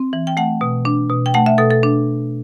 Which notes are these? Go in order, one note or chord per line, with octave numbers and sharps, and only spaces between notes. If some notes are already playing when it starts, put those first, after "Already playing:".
Already playing: C4
E3
G5
A3 F#5
B2
D4
B2
G5
A3 F#5
E5
B2 A4
A4
D4